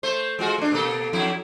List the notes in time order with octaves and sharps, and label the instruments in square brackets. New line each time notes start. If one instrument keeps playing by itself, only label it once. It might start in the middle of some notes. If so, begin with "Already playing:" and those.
[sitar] A3 C5
G#3 F4 F#4
A3 D4
B2 A#3 A4
F2 F#3 E4